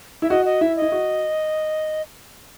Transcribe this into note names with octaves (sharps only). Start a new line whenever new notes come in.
E4 E5
F#4 D#5
D#5
E4 E5
D#5
E4
F#4